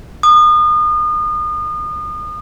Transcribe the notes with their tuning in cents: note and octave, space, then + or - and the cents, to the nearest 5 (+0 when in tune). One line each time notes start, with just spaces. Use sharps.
D#6 -35